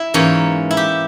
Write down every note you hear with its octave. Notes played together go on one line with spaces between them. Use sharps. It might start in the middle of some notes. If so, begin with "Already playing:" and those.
Already playing: E4
G#2 E3 A#3 C#4
E4
G4